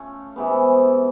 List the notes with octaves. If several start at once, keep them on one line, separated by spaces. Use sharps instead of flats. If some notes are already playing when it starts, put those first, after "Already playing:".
Already playing: A3 C#4 F4
C3 E3 G#3 B3